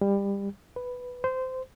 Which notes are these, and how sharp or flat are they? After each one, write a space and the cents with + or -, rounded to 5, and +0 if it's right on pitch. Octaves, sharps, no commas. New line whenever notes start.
G3 +25
B4 +5
C5 -20